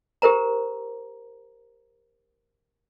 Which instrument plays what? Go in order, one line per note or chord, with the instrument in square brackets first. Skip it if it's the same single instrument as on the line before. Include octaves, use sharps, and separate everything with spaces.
[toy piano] G4 A#4 C5 A#5